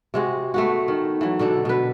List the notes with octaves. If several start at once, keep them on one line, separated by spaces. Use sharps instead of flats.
C3 G#3 F#4
A3 B3 F#4
D#3
E3 F#3
B2 D3 D4 A4
B2 B4